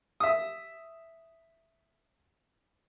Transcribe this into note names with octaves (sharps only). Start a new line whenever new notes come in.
E5 D#6